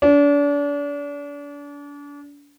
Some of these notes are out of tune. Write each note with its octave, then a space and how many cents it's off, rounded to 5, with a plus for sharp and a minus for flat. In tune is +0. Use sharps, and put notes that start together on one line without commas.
D4 -35